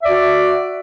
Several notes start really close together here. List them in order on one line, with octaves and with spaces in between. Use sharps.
E5 D5 F#4